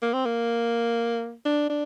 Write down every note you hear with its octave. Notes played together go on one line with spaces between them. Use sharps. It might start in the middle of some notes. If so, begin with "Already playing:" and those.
A#3
C4
A#3
D4
D4